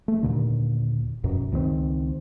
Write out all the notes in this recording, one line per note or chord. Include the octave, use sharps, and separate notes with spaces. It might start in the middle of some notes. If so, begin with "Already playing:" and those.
A3
D#2 A#2 D3
A#1 F#2 B2
C#2 D#3 G#3 C4